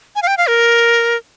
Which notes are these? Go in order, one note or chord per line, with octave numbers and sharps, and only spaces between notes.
G#5
F5
G5
F5
A#4